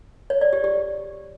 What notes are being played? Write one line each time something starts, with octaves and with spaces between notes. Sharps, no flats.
C#5
D5
G4
G4